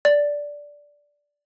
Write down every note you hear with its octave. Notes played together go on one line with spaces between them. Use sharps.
D5